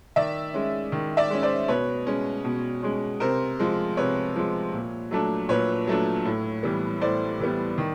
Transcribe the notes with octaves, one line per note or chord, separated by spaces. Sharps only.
D#3 D5 E5
G#3 C#4
D#3
D5 E5
G#3 C#4
C5 D5
B2 B4 C#5
G#3 C#4
B2
G#3 C#4
C3 A#4 C5
F3 G#3
C3 B4 C#5
F3 G#3
A#2
F#3 A3 D4
A#2 B4 C#5
F#3 A3 D4
A2
E3 G3 B3
A2 C5 D5
E3 G3 B3
D#3